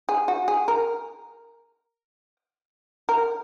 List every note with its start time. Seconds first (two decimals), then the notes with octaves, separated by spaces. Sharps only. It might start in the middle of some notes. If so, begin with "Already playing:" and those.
0.09 G#4
0.28 F#4
0.48 G#4
0.68 A#4
3.09 A#4